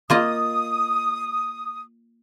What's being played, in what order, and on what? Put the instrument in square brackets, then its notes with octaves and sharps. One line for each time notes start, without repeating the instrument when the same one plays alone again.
[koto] A#3 F4 D#5 [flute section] D#6